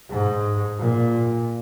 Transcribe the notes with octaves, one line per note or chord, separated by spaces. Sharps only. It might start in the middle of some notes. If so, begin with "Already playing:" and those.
G#2
A#2